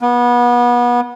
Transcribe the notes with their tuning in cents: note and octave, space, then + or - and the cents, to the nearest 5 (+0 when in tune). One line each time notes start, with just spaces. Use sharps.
B3 -30